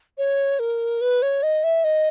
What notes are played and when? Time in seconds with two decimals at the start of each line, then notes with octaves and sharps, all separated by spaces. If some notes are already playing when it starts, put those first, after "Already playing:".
0.18 C#5
0.59 A#4
1.01 B4
1.22 C#5
1.43 D#5
1.64 E5
1.84 D#5